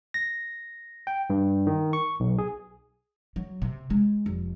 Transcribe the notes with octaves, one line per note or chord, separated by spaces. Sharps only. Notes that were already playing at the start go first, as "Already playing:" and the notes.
A#6
G5
G2
D#3
C#6
B1
G#4
F#3
C3
G#3
F1